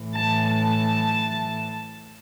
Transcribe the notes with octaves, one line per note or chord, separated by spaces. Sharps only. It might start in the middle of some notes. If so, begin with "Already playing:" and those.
Already playing: A2 E3
A5
A5